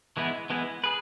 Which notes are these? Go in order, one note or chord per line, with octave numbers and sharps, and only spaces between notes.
E3 G#3 B3 E4
E3 G#3 B3 E4
G#4 B4